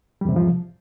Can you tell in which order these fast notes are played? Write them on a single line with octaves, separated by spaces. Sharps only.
G3 E2 C3 G#2 F3